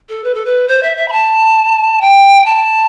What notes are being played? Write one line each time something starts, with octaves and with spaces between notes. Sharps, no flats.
A4
B4
A4
B4
C5
E5
E5
B5
A5
G5
A5